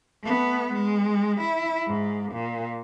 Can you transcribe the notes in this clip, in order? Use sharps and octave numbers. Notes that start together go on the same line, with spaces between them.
A3 B3
G#3
E4
G#2
A#2